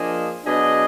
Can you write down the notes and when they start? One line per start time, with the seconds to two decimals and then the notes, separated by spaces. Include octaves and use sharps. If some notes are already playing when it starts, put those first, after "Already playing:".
Already playing: F3 A#3 D4 G#4 D#5
0.44 B2 F#3 D4 G#4 D#5